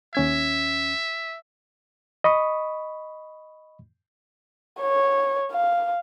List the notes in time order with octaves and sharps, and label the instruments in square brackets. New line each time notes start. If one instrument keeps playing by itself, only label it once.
[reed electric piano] D#2 C#4 G#6 [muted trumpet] E5
[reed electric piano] D#5 B5 C#6 D#6
[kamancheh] C#5
F5